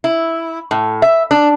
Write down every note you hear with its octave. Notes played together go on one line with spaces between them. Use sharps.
E4
A2
E5
D4